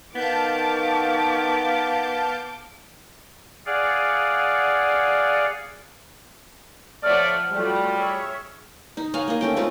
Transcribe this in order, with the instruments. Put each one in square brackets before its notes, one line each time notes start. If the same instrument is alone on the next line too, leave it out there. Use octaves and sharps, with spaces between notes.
[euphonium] D#3 [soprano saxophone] B3 [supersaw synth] F5 A5 G6 [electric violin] D6
[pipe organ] G#4 D5 F5 F#5
[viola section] F3 F#5 [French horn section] A3 C#5 D5 [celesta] F6
[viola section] F#3 A3 F4 [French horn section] G3
[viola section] G#4 C#5 E5
[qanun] D#4
C#5 F5 F#5 G#5
A#3 D#5
A3 C#4 G5
G#3 C4 C#4 F4